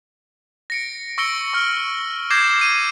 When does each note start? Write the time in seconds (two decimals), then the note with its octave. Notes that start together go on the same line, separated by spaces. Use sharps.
0.70 A#6 C#7 D7
1.18 C#6 E6 A#6 C#7 D7 G7
1.54 C#6 F6
2.30 D6 G6 G#6 A#6 C7 E7
2.61 D#7